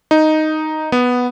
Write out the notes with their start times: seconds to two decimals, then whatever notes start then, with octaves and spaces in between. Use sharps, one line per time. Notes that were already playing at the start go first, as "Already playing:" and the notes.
0.11 D#4
0.92 B3